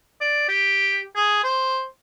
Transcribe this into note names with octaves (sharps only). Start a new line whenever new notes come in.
D5
G4
G#4
C5